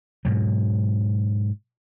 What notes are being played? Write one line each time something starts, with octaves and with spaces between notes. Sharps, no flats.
G#2 B2 F#3